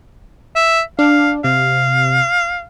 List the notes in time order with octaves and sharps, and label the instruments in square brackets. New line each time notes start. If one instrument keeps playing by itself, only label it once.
[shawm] E5
[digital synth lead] D4 [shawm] F5
[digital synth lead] C3 [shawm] F5